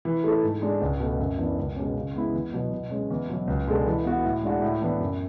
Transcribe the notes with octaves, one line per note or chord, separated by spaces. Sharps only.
E3
A3 E4 A4
G#2
G#3 D4
C#2
B2 A3
F#2
E3 B3 D4
C#2
B2 G#3 C#4
C#3
G#3 B3 E4
E2
B2 F#3 B3
B2
G#3 C#4
E2
B2 F#3
C#2
B2 G#3 D4 A4
E3
B3 F#4
A2
G#3 D4 F#4
A2
E3 B3 D4
F#2